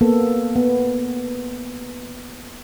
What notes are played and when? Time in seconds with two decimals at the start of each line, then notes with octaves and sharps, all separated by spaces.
0.01 A#3 B3 A4
0.55 B3